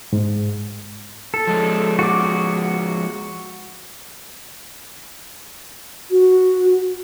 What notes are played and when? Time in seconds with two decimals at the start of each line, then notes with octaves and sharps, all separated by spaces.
0.13 G#2
1.34 A4
1.47 F3 G#3
1.99 F#4 D6
6.11 F#4